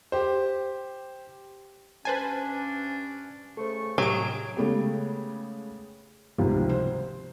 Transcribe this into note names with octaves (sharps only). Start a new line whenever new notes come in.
G4 C5
G2 C#4 D4 B4 C5 G#5 A5 A6
C#3 A3 A4 C5 C#6
A2 C3 D#3 F#3 G4 G#4 D7
C#3 G#3 A3 B3 G4
G#1 C#2 C3 F3 G3
C5